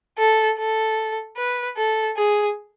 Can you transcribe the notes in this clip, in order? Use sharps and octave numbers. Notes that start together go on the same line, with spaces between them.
A4
A4
B4
A4
G#4